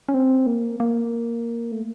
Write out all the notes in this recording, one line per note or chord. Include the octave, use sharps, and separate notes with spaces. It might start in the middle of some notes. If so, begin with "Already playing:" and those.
C#4
C4
A#3
A#3
A3